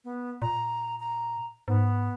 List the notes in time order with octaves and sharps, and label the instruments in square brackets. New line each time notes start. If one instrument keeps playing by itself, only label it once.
[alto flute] B3
[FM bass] A#2 [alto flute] A#5
[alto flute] A#5
[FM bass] G#2 [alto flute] B3